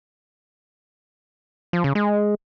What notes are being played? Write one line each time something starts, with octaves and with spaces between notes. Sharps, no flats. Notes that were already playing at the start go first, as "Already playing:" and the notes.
F3
C#3
G#3